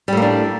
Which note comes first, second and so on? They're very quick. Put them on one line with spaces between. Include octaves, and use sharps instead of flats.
G3 A2 A#3 D4